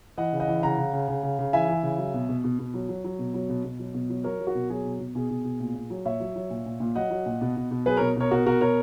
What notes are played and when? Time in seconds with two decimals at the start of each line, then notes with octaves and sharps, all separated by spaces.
0.18 E3 D#5 F#5
0.33 C#3
0.40 D#5 F#5
0.48 E3
0.63 C#3 F#5 A#5
0.78 C#3
0.93 C#3
1.08 C#3
1.23 C#3
1.39 C#3
1.53 E3 E5 G#5
1.68 E3
1.83 C#3
1.98 F#3
2.14 B2
2.29 B2
2.44 B2
2.59 B2
2.74 F#3
2.89 F#3
3.04 F#3
3.19 B2
3.34 F#3
3.49 B2
3.64 B2
3.79 F#3
3.94 B2
4.10 F#3
4.24 F#3 A#4 C#5
4.40 F#3
4.47 F#4 A#4
4.55 B2
4.70 F#3 G#4
4.85 B2
5.00 B2
5.15 B2 G#4
5.30 B2
5.44 B2
5.60 A#2
5.75 A#2
5.90 F#3
6.05 A#2 C#5 E5
6.20 F#3
6.36 F#3
6.50 A#2
6.66 A#2
6.80 A#2
6.95 F#3 D#5 F#5
7.10 F#3
7.26 A#2
7.41 B2
7.56 B2
7.71 B2
7.86 F#3 G#4 B4
7.97 B2 A#4 C#5
8.16 B2 A#4 C#5
8.31 B2 F#4 A#4
8.46 B2 F#4 A#4
8.61 B2 A#4 C#5